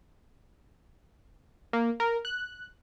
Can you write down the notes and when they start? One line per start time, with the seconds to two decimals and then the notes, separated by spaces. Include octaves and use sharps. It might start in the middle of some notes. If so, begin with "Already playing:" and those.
1.73 A#3
2.00 A#4
2.25 F#6